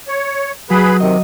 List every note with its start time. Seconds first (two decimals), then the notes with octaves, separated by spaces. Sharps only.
0.08 C#5
0.70 F#3 G#4 B4 B5
1.00 C3 D#3 D#5